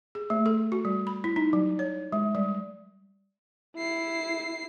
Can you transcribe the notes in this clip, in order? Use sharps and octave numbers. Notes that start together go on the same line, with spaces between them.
G#4
A3
A4
F#4
G3
B5
E4
D#4
F#3
C#5
G#3
G3
E4 C7